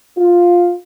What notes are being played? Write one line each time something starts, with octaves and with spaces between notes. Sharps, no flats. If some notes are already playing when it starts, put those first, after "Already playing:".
F4